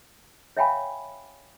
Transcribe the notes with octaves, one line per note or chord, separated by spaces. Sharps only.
C#5 E5 F5 G5 G#5 B5